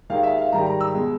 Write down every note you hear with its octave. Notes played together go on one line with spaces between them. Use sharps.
D#2 D#3 G#3 F5
E5
F5
G#2 D#3 G3 A#5
A#5
E6
B2 G#3